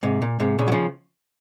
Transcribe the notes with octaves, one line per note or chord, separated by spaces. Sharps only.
G#2 C3
A#2
G#2 C3
A#2 C#3
F#3
C#3 F3